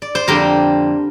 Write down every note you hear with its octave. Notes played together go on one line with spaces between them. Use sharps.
D5
C5
F2 D3 G3 A#3 G4 A#4